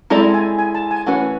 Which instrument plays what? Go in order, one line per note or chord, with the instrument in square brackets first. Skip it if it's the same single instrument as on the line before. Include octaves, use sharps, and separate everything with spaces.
[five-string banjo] G#3 C4 E4 A4 D5 [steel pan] A#5
[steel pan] G#5
G#5
A5
G#5
[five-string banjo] E3 A3 C#4 F#4 B4 [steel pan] F#5